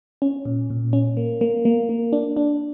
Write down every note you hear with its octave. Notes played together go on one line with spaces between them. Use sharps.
C#4
A#2
A#2
C#4
A#3
A#3
A#3
A#3
D4
D4